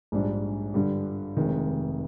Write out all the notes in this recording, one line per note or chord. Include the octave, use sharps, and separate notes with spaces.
A#1 G#2 G3 D4
G2 D3 G3
F1 F2 D#3 G#3